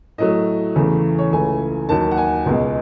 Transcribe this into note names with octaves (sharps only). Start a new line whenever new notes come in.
A2 F#3 A3 D#5
E2 C#3 E3 A3
C#5
C#2 C#3 E3 A3 G#5
D#2 D#3 F#3 A5
F#5
G#5
C#2 B2 G#3